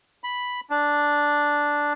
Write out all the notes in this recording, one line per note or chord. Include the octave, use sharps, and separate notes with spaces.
B5
D4